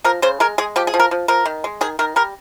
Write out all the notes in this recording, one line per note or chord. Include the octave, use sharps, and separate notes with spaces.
F3 A#4
C#3 C5
G#3 A#4
G#3 G#4
F3 G4
G#4
F3
A#4
F3
F3 A#4
D#3
G#3
D#3 G#4
D#3 A#4
G3 A#4